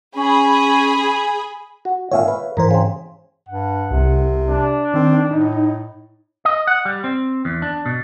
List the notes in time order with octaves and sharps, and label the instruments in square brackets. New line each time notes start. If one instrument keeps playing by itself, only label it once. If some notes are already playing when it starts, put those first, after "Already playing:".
[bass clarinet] C#4 [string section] G#4 B5
[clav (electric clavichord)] F#4
[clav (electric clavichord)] G#1 A#2 [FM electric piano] C#5 E5 F5
[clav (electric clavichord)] B4
[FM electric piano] G#2 E3 C5 [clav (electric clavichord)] A#4
[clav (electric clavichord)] C#3 C4
[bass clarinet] G2 [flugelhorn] F#5
[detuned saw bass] C2 [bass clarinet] C3
[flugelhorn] D4
[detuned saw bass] D#3 [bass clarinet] C4
[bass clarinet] A2 [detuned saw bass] D#4
[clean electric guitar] D#5
F#5
G3
C4
E2
D4
B2